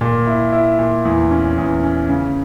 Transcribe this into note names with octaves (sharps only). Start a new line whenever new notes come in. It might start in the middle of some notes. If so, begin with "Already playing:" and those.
A#2
E4
E4
A#2
E2
C#4
E2
C#4
C#3